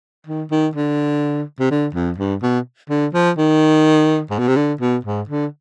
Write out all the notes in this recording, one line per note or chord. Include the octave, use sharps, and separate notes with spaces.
D#3
D#3
D3
C3
D3
F2
G2
B2
D3
F3
D#3
G#2
B2
C3
D3
B2
G#2
D3